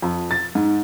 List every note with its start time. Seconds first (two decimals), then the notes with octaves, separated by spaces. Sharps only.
0.02 F2
0.31 A6
0.55 G#2